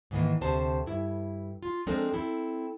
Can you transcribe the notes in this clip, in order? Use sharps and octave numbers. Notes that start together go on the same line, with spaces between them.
G#2 D#3 E3 A#3
D2 C3 C5 A5
G2 E4
F4
F3 G#3 C4 D4 A4 A#4
C4 E4 A4